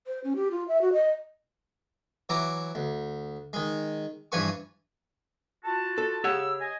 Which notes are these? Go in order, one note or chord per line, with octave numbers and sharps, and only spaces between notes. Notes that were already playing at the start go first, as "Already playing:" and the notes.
C5
C#4
G4
F4
E5
F#4
D#5
E3 F#3 E4 A#5 D6
D2
D#3 G#3
G2 E3 F3 B4 G#5 C#6
F4 F#4 A5
A4
C#3 G4 C#5 F#5 E6
D#5 G#5